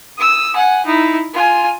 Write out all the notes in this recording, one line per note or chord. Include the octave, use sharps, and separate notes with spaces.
D#6 E6
F#5 G#5
D#4 E4
F4 G#5